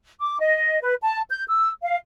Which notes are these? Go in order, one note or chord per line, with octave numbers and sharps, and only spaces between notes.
D6
D#5
B4
A5
G6
E6
F5